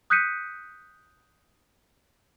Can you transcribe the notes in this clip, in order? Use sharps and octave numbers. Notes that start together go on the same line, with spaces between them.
D#6 F#6 G6 B6 C#7 D#7